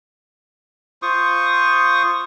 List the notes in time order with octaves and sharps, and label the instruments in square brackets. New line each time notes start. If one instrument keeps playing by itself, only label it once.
[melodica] F4 C5 C#6 D#6